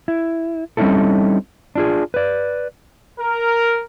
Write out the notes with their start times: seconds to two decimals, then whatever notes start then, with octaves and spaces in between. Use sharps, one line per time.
0.08 E4
0.77 G3 C4 C#4 D#4 E4 A4
1.75 D4 F4 G#4
2.14 B4 D5
3.19 A#4